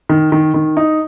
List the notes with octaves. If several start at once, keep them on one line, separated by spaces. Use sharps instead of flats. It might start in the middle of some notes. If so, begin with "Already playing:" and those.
D#3
D#3
D#3
D#4